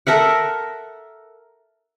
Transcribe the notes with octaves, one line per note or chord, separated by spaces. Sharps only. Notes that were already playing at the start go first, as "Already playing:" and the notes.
A4 A#4 E5 F#5